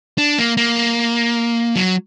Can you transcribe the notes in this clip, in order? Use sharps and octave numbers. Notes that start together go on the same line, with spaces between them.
D4
A#3
A#3
F#3